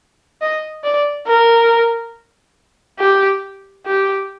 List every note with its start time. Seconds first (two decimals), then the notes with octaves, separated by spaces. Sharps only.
0.41 D#5
0.84 D5
1.27 A#4
2.99 G4
3.86 G4